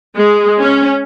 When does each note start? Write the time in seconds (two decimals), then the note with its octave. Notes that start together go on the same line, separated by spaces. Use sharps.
0.15 G#3
0.60 C#4